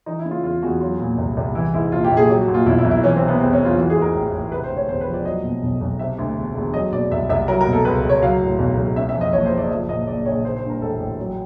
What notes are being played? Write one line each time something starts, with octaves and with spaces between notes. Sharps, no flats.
E3 D#4
E4
C#3
F4
E2 F4
E2 F#4
F#3 F4
A#2
C2
C2
E3 E4
G#2 E4
A#1 F4
G4
A#1
G#4
F#3 G4
F#4
A#2
F4
B1 E4
E4
B1
E4
E3 C#4
C4
C3
B3
E2 C4
C#4
E2
F4
E3 F#4
G#4
G#2
A#4
A1
A1
C3 B4
C5
D2
C#5
E1 C5
B4
F3
D5
F#3 D#5
B2
B1
B1
C3 E5
D2
E1
E1
F#3 D#5
B2 D5
C2 E5
C2 E5
F#3 A#4
A#4
B2
A4
C#2 B4
C#2
C#5
F#3 F5
A2
B1
B1
C#3 E5
E5
F2
D#5
F#1 C#5
C5
F#1
D5
F3 E5
A#2 D#5
A#1 D5
A#1 C#5
D#3 C5
C5
G2
A#4
A1 A4
A1
F#3